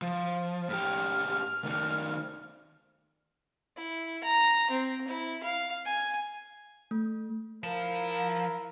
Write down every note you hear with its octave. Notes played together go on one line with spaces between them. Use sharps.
F3
A2 G4 F6
D#3 A3
E4
A#5
C4
E4
F5
G#5
A3
F3 E4 A#4 F5 A5